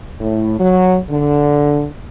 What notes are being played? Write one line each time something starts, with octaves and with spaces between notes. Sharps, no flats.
A2
F#3
D3